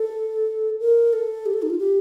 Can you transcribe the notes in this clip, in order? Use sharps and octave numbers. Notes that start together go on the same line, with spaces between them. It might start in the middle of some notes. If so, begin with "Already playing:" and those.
Already playing: A4
A#4
A4
G4
A4
D#4
F4
G4